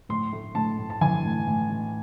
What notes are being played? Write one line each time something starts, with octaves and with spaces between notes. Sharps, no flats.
A2 C6
A3
A2 A5
A2
A5
E3 G#5
A2
A2
A2